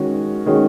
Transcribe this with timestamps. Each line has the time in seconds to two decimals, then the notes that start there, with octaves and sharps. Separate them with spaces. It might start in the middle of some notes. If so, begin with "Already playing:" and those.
Already playing: D#3 G#3 C#4 F#4
0.46 D#3 G#3 C#4 F#4